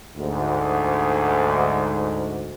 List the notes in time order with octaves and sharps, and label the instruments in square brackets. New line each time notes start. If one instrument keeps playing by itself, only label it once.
[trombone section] D2 G#2